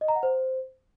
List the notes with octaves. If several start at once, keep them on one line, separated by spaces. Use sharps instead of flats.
D#5
A#5
F#5
C5